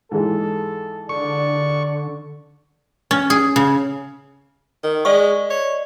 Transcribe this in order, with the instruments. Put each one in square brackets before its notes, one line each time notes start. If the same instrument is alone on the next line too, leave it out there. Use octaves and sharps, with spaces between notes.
[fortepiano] G#2 E3 G#3 [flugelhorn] A4
[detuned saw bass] D3 [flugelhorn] D5 [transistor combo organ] C#6
[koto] C#4
G#4
C#3
[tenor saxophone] D#3
[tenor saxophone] G#3 [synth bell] D5 D#5 C#6
[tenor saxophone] C#5